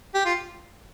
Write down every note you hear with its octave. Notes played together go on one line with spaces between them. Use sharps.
G4
F4